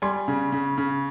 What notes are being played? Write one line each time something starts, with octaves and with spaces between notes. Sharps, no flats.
G3 G#5 C6
C#3
C#3
C#3